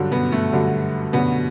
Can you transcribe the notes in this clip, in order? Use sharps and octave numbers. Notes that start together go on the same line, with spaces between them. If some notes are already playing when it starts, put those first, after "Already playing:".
Already playing: G2 D3 F#3
B2 B3
A3
G2 D3 F#3
G2 B2 D3 F#3 B3